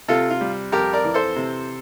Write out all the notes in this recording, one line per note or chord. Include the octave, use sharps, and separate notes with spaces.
C3 F4 A4
F4
G3
F2 G4 A#4
A#4 D5
E3
A4 C5
C3